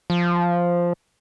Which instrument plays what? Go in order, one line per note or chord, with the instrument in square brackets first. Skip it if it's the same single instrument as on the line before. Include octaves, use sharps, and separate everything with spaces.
[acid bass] F3